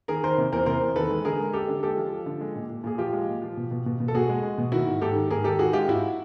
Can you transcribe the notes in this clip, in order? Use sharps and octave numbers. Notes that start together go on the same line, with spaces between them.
D#3 G#4 A#4
D#3 A#4 C5
C3
E2 A#4 C5
C3 A#4 C5
E2
D#3 A4 B4
G#3
D3 G#4 A#4
G#3
G#3 G4 A4
D3
G#3 G4 A4
F3
F3
D3
G#3
A#2
A#2
A#2 G#4
F3 F4 G4
G#3
A#2
F3
B2
B2
B2
B2
A4
B2 F#4 G#4
G#3
G#3
B2
D#3 E4 F#4
G#2
G#2 G4 A4
D#3
G#2 G#4 A#4
D#3 G4 A4
D#3 F#4 G#4
G#3 F4 G4
G#2 E4 F#4